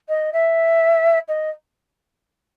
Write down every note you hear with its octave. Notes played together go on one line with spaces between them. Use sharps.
D#5
E5
D#5